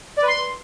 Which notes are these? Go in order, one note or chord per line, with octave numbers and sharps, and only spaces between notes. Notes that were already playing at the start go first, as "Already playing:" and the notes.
D5
B4
C6